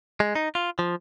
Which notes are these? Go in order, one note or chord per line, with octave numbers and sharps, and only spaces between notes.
G#3
D#4
F4
F3